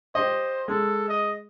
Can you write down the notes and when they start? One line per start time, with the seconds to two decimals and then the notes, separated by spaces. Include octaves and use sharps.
0.15 G4 C5 D#5
0.68 G#3 A4
1.09 D#5